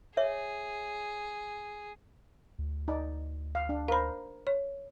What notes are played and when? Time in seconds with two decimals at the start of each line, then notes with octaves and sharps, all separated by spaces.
0.17 G#4 C#5 E5
2.59 D2
2.88 D#4 D5
3.55 F5
3.69 D4
3.88 A#4 C5 F5 B5
4.47 C#5